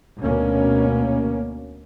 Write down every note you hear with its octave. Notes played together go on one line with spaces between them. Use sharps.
D2 B2 A#3 C#4